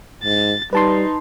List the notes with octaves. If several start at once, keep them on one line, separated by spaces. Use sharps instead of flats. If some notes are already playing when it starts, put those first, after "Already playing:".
G#2 A6
G3 D#4 B4 A5 C6